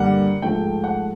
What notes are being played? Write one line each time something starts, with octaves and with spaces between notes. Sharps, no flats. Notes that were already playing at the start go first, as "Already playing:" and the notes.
Already playing: G2 D3 G3 A#3 F#5
G#2 F3 A3 G5
F#5